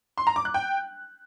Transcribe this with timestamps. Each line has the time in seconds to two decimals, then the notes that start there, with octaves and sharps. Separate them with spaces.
0.18 C6
0.27 A#5
0.36 D6
0.45 F#6
0.54 G5